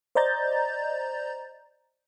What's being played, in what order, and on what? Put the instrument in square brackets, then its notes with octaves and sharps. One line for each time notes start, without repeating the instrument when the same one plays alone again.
[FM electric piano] C5 D5 D#5 A#5 G6 A6